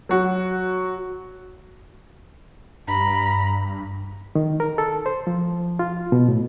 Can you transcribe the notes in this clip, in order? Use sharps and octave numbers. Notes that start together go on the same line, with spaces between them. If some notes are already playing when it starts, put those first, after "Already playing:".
F#3 F#4
G2 A#5 B5
D#3
A#4
A4
C5
F3
F4
B2
A2